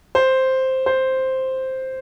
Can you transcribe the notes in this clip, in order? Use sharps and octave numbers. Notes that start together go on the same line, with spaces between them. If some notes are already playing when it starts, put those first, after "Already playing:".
C5
C5